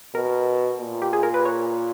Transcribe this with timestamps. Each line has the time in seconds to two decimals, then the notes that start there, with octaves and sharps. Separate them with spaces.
0.15 B2 A#4
0.80 A#2
1.02 G4
1.13 G#4
1.23 A#4
1.34 B4
1.45 C#5